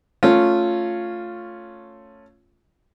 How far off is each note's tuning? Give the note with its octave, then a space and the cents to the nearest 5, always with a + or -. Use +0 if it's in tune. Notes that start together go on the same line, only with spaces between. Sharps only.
A3 +10 C#4 +0 F4 +0